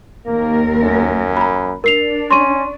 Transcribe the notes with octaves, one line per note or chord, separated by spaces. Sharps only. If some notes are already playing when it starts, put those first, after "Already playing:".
D#2 A#3 A#4
F#2
A#5 B5
D4 A#4 C7 F7
C#4 C6 C#6 D#7